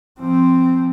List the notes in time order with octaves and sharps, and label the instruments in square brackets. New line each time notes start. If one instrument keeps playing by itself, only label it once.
[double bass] F3 C4